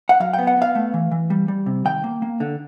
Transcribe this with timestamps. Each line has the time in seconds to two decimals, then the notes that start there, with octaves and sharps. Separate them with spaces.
0.09 F#5
0.20 F#3 F5
0.33 G5
0.39 B3
0.47 F#5
0.57 B3 F5
0.75 A3
0.94 E3
1.11 E3
1.30 G3
1.48 G3
1.66 C3
1.85 D#3 G5
2.04 A#3
2.22 A#3
2.40 D3